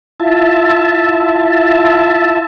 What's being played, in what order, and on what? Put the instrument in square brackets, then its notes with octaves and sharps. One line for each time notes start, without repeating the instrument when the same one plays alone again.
[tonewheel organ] E4 F4 E5 A5